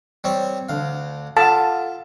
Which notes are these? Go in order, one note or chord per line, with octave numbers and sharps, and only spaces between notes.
G3 C4 C#5
D2 F5
F4 A4 F5 F#5 A5